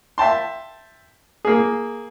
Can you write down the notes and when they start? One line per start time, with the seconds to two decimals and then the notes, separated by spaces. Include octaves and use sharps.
0.18 E5 G5 A5 C6
1.45 A#3 G#4